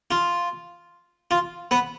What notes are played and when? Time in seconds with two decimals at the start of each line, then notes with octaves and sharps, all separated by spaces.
0.11 F4
1.31 F4
1.71 B3